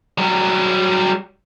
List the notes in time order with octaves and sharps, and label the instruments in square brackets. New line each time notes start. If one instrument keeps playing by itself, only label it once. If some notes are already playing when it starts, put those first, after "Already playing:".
[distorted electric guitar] F#3 G3